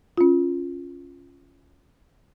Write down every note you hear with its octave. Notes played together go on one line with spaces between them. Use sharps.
C#4 F4